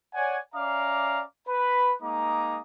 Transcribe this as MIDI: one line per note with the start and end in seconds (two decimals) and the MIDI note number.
0.14 0.38 73
0.14 0.38 74
0.14 0.38 78
0.14 0.38 80
0.54 1.22 61
0.54 1.22 74
0.54 1.22 76
0.54 1.22 77
0.54 1.22 82
0.54 1.22 86
1.48 1.93 71
1.48 1.93 83
2.02 2.60 56
2.02 2.60 58
2.02 2.60 63
2.02 2.60 75
2.02 2.60 82
2.02 2.60 86